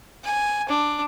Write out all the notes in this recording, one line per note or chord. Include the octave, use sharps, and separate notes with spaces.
G#5
D4